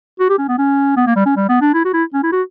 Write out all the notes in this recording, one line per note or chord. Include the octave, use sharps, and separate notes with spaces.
F#4
G4
C#4
B3
C#4
B3
A#3
G3
C#4
G3
B3
D4
E4
F#4
E4
C#4
E4
F#4